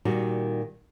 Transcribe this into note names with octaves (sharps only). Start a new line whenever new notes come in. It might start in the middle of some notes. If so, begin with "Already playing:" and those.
A#2 D#3 G3 F#4